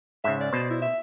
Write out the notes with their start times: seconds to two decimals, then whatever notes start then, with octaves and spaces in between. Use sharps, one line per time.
0.24 G#2 C#3 E5
0.40 D5
0.53 B2 C5
0.70 E4
0.82 E5